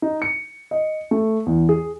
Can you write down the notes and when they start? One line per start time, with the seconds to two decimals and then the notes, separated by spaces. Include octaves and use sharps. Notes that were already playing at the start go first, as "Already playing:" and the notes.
0.02 D#4
0.22 C#7
0.71 D#5
1.11 A3
1.46 E2
1.69 G#4